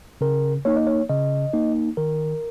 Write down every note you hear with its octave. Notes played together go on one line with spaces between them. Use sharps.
C#3 A#4
A#3 D#4 C#5
D#5
C#5
C#3 D#5
A#3 D#4
D#3 A#4